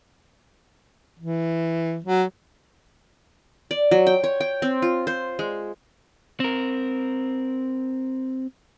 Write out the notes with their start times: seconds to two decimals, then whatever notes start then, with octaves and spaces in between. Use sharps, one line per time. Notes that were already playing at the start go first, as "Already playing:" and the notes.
1.19 E3
2.04 F#3
3.71 D5
3.91 F#3
4.07 G5
4.24 C#5
4.40 G5
4.62 C4
4.82 F4
5.07 C5
5.39 G#3
6.40 C4 A#4